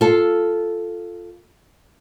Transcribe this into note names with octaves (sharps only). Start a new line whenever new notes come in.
F4 A4